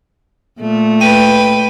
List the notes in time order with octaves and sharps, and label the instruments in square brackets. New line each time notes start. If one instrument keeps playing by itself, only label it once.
[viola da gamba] A#2 A3
[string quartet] B4 G5 [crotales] D#7